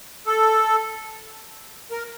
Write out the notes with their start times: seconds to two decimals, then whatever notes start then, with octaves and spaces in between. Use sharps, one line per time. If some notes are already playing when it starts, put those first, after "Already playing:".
0.27 A4
1.91 A#4